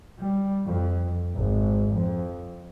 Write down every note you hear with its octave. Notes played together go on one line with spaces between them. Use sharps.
G3
F2
G#1
F2